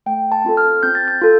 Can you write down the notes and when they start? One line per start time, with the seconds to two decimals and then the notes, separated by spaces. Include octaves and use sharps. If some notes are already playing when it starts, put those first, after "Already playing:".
0.06 A3 G5
0.32 A5
0.45 C4 F4 A4
0.57 F6
0.83 C4 G6
0.95 A6
1.08 G6
1.21 F4 A4